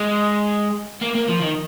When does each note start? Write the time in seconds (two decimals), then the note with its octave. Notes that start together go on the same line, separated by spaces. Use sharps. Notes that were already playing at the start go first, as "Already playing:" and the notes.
Already playing: G#3
1.01 A#3
1.15 A#3
1.29 F3
1.42 D#3